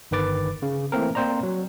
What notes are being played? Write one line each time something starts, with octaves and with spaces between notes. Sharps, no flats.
G1 D#3 B4 D6 A6
C#3
E3 A3 A#3 C4 A#4
A#3 C4 C5 D5 A#5
F#3